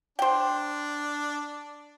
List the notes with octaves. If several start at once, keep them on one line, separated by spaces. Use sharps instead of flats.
D4 C5 G5